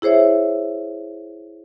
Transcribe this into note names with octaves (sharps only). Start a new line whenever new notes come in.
E4 G#4 C5 C#5 E5